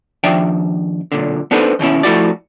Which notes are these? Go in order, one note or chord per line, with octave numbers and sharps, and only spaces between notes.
D#2 F3 D4 E5 G5
B1 A#2 D3
B3 D4 D#4 A4 B4 C5
D#2 B2 C#4 E4
F3 A3 E4 F#4 D5